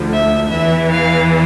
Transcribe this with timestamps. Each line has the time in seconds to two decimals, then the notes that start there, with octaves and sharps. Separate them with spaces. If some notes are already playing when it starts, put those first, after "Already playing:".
Already playing: D2 D3 F3
0.13 E5
0.50 E2 E3 E5
0.89 F5